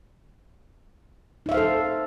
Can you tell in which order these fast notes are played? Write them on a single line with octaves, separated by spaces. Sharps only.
D#4 E5 F5 C5 A4